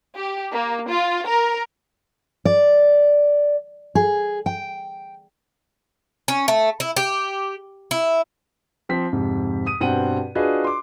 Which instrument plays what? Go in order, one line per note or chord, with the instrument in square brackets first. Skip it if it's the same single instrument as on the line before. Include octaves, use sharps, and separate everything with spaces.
[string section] G4
A#3
F4
A#4
[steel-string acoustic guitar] D5
G#4
G5
[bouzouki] C#4
A3
E4
G4
E4
[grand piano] F3 C4 B6
F2 G#2 C3
D#6 D#7
G2 B2 C4 F#5 G5 D#7
D4 F4 F#4 G#4 B4 D#5
C6 D6